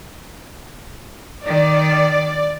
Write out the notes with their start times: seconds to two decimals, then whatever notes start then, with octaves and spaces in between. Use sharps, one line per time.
1.46 D#3 D5